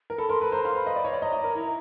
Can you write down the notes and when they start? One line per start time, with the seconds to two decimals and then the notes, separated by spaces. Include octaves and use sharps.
0.10 A#4
0.18 A4 B5
0.29 A#4 C6
0.41 B4 B5
0.52 C5 A#5
0.64 F5 C6
0.76 B5
0.87 D#5
0.96 D5
1.04 C#5
1.13 D5
1.22 D#5 A#5
1.33 D#5
1.44 A#4
1.55 E4